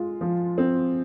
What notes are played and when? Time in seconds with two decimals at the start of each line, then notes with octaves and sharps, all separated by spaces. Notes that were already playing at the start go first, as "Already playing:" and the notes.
Already playing: G#3 F4
0.21 F3
0.58 C4